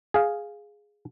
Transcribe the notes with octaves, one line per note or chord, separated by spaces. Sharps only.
G#4 F5